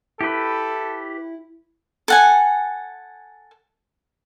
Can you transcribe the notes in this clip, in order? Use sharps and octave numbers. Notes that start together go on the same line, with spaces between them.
E4 G4 A4 B4
A4 F#5 G#5